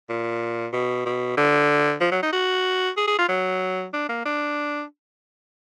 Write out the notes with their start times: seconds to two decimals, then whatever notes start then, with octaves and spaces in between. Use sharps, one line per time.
0.09 A#2
0.73 B2
1.05 B2
1.37 D3
2.01 F3
2.12 F#3
2.23 D#4
2.32 F#4
2.97 G#4
3.07 G#4
3.19 F4
3.29 F#3
3.93 D4
4.09 A#3
4.25 D4